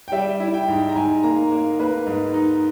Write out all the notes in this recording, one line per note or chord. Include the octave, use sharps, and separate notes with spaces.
G5
G3 E5
E4
G5
G#2
A#5
G#2 G#5
A#3 A#5
A#3
A#3 B4
G#2
D#4